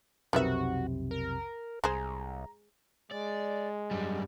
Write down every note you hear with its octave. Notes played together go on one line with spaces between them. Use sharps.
B1 F2 C3 D#3 F#4 B4 E5
A#4
C2 G#3 G#4 C5 A#5
G#3 D5
F#2 G3